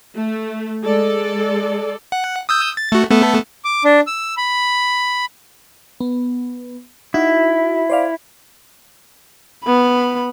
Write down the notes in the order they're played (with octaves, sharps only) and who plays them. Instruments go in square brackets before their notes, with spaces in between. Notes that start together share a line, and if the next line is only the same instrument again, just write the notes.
[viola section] A3
G#3 A4 D5
[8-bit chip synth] F#5
D#6 E6 G6
A6
A3 F#4
A3 B3 A4
[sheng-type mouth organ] D6
D4
E6
B5
[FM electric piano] B3
[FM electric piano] D#4 F#4 [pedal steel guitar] E4
[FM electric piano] C5 D5 F5
[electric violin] B3 B5